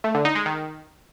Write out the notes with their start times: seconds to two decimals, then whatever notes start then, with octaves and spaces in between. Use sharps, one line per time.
0.04 A3
0.14 D3
0.25 D#4
0.35 G#3
0.46 D#3